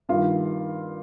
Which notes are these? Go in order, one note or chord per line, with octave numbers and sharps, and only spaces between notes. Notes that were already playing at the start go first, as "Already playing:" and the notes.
G2 D#3 F4